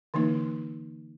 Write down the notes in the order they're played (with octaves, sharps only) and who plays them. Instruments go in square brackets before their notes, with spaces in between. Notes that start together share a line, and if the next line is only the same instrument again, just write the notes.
[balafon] D3 E3 A#3 D#4